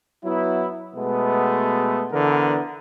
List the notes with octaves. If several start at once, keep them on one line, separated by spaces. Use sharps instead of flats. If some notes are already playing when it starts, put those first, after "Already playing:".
F#3 B3 E4
B2 G#3 A3 B3
D3 E3 B3 A4 A#4